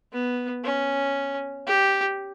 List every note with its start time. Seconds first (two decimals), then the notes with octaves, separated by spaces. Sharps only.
0.12 B3
0.64 C#4
1.67 G4